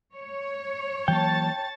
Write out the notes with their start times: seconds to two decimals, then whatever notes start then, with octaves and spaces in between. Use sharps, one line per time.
0.15 C#5
1.08 E3 F#3 A#3 G5 A5 A6